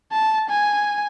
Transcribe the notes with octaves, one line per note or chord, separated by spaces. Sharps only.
A5
G#5